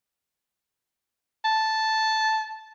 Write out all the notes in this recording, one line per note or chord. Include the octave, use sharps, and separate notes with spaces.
A5